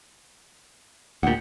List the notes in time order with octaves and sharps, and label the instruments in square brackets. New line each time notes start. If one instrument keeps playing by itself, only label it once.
[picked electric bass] D2 A#2 [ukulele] G4 F#5